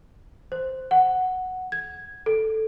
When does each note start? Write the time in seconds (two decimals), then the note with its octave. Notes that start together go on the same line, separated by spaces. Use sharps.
0.52 C5
0.91 F#5
1.72 G#6
2.26 A4